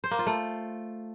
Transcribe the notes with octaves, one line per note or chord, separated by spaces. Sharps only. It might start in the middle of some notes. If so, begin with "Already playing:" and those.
C5
A#3
F4
A3